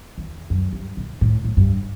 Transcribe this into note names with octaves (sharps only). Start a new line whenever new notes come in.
E2
F#2
G2
B2
A2
A2
G2